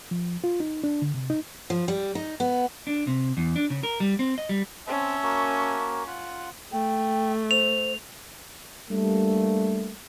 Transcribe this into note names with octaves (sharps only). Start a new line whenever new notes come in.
F3
F4
D#4
D4
D3
C3
D#4
F3
G3
D#4
B3
D4
C3
E2
D4
C#3
A#4
G3
C4
D#5
G3
C4 C#4 E5 A5
A#3 F#4 A#4
F4 F#5
A3 G5
C5 F7
G3 A3 A#3 D4